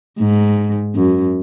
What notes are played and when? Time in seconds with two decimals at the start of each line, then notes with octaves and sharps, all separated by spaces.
0.18 G#2
0.96 F#2